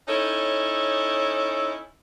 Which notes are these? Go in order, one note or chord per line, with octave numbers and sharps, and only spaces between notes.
C#4 D#4 E4 A4 C#5